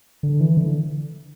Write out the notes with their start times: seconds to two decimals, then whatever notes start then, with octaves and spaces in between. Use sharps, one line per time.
0.23 D3
0.40 E3
0.57 D3